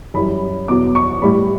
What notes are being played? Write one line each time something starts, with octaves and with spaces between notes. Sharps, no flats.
F#2 E3 G3 B5
E2 B2 F#3 D6
C#6
A2 G3 B5